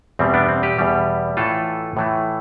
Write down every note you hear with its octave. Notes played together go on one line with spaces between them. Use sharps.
E2 B2 G3 C4
B3 D4
C4
G4 B4
E2 B2 G3
A2 E3 A3 F4 A4
A2 E3 A3